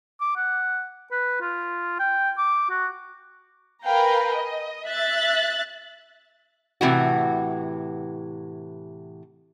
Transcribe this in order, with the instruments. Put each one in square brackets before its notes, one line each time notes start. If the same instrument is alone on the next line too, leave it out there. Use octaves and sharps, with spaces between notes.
[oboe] D6
F#5
B4
F4
G5
D6
F#4
[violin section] A#4 B4 F5 G5 G#5 A#5
D#5
E5 F#6 A6
[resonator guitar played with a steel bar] A2 C3 E3 F#4